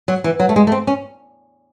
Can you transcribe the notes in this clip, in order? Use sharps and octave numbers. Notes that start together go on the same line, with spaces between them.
F#3
E3
F#3
A3
G#3
A3
C4
C#4